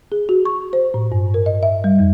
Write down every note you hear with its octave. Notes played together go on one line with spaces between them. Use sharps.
G#4
F#4
C#6
C5
A2
G2
A#4
D#5
E5
G3
F2